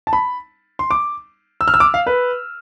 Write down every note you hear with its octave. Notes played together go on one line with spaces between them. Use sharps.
A5
B5
C6
D6
E6
F6
E6
D6
F5
B4